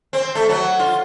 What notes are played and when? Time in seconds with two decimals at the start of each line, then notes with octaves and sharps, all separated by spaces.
0.13 C4
0.35 A3
0.49 F#3
0.79 F4